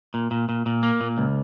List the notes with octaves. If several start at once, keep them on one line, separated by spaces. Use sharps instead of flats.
A#2
A#2
A#2
A#2
A#3
A#2
C#2